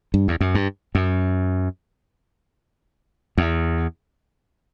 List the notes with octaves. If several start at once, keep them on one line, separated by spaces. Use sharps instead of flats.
G2
E2
F#2
G2
F#2
E2